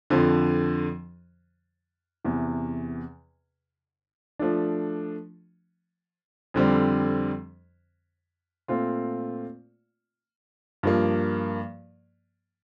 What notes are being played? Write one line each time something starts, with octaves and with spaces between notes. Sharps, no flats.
F2 D3 F3
E2 C3 E3
F3 A3 D4
F2 D3 G3 C4
A#2 A3 C4 F4
G2 F3 A#3